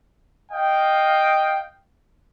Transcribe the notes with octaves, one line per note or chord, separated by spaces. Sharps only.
D#5 F5 G5